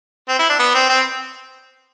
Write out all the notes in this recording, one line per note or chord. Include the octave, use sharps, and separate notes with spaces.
C4
E4
D4
B3
C4
C4